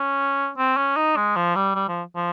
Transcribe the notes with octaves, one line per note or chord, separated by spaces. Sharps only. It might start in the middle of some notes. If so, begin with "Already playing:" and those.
Already playing: C#4
C4
C#4
D#4
G#3
F3
G3
G3
F3
F3